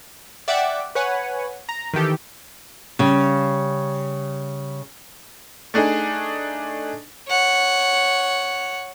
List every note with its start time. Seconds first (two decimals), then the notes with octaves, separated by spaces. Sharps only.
0.48 D5 E5 F#5 G5 D6
0.95 B4 C#5 F#5 G#5
1.69 A#5
1.94 D#3 E3 G4 A4
2.99 C#3 G3
5.74 A3 D4 D#4 G#4
7.29 C#5 F#5